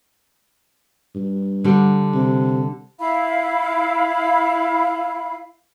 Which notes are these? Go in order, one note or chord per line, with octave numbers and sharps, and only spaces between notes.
G2
D3 G3
C3
E4 F5 B5